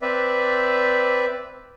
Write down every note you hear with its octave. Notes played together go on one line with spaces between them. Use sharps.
C4 B4 D5 E5